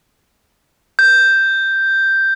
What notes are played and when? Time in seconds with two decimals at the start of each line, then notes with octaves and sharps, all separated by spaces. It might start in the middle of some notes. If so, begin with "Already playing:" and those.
0.99 G6